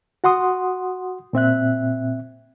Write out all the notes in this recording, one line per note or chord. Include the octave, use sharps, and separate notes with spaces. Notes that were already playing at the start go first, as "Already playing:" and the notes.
F#4 F#5 C6 D#6
A#2 C4 E5 F#6